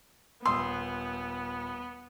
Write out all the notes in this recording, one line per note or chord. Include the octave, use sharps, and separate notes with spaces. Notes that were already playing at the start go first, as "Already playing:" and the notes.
D#1 B3 C6 D#6 E6